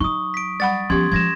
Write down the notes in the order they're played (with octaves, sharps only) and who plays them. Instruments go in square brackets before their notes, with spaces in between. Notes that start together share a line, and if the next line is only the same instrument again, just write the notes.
[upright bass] F#3 D#4 [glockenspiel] C#6 D#6
[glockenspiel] B6 D7
[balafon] G3 F#5 B5 [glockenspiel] A6
[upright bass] F3 B3 [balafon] C#4 G4 [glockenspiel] C6 G#6
[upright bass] F3 G#3 [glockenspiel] G#6 A#6 E7